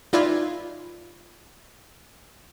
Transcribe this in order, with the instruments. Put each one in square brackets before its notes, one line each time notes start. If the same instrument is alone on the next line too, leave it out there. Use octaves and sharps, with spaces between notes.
[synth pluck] D#4 F4 B4 D5 E5 G#5